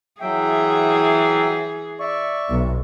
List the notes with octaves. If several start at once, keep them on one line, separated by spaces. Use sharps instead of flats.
E3 F#3 G#4 E5 G5
D5 E5 C#6
B1